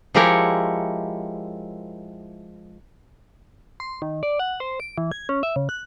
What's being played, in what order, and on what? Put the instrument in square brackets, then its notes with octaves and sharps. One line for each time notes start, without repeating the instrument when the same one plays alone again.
[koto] F3 G#3 E4 G4 A#4 C#5
[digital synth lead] C6
D#3
D5
F#5
C5
D7
E3
G#6
C#4
E5
C#3
F#6